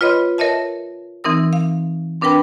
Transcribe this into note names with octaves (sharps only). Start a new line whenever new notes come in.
F4 B4 C#5 D#5 B5 C6
A#4 C#5 D#5 E5 A5
E3 C4 D#4 A#4 E6
F5
C4 D4 A#4 B4 G5 B5